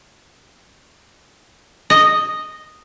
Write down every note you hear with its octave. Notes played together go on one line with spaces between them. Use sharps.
D#5